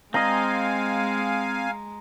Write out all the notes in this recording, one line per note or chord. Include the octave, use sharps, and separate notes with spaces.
G#3 C4 D#5 F5 G#5 A#5